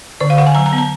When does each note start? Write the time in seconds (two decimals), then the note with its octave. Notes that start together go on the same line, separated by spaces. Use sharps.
0.20 D3 D5
0.30 F5
0.38 D3 F#5
0.47 G#5
0.55 F#3 A#5
0.66 A#5
0.73 B3
0.78 A#5